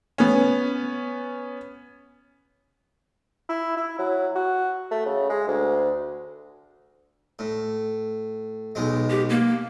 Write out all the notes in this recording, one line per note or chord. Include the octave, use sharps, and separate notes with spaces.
B3 C#4
E4
E4
F#3
F#4
A3
C#3
G#3
D2
A2
B1 B2 G#3
G4
A#3